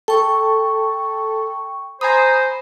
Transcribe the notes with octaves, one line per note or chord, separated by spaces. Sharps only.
A4 G5 C#6
C5 G#5 A#5 B5 D#6